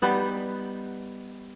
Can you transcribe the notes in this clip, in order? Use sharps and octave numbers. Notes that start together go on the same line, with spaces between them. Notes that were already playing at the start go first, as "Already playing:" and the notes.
G3 B3 D#4